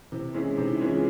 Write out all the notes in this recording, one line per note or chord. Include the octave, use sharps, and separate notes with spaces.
C3 E4
E3 G#3 C#4
C3 D#4
E4
E3 G#3 C#4 F4
F4